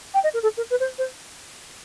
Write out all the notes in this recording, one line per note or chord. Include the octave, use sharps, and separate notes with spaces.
G5
D#5
A#4
A4
A#4
B4
C5
C5